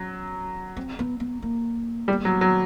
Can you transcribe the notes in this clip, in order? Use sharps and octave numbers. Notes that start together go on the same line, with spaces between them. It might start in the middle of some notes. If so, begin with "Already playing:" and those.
Already playing: F#3 C#4
C4
B3
B3
A#3
G3
F#3
F#3